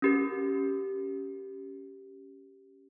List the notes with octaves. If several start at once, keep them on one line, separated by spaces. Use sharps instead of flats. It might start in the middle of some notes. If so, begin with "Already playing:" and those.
C#4 G4 A#4